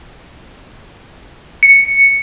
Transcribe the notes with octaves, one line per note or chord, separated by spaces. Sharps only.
C#7